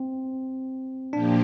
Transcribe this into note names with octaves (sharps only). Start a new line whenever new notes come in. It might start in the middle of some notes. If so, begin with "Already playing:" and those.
Already playing: C4
A#2 F3 A#3 D4 G4